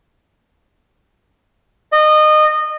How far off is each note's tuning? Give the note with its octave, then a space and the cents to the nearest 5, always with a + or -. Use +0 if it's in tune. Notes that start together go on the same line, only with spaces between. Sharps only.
D#5 -25